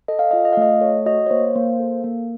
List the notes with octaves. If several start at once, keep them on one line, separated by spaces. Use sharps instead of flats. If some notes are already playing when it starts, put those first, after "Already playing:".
A4 D#5
F5
F4 D#5
D#5
F5
A3 D#5
A4 C#5
F#4 D#5
C#5
A#3 C5
A#3
A4
A#3